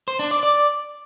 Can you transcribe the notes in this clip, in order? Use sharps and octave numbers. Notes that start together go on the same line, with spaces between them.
C5
D4
D5
D5